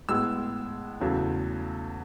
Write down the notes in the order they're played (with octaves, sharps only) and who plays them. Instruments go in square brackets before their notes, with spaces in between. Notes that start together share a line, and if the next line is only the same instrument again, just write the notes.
[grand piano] A2 G#3 B3 E6
E2 C#3 F#3 A3